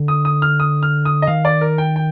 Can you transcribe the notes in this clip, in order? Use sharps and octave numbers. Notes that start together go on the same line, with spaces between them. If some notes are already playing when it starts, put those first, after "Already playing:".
Already playing: D3
D#6
D#6
F6
D#6
F6
D#6
D#5
D#3 F5
D5
A#4
G5
G5